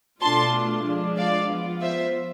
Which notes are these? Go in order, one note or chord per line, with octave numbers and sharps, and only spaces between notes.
B2 A3 D4 F4 A5 C6
F3 G#3 D4 F4
D5 F5
F3 B3 F4
C5 E5